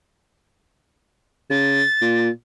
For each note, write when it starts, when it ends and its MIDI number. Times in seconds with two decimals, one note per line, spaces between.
1.50 1.82 49
1.50 2.29 93
2.01 2.29 46